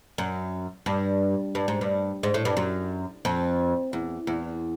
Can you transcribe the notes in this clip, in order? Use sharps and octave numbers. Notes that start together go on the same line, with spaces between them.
F#2
G2
G2
G#2
G2
G#2
A2
G2
F#2
F2
E2
E2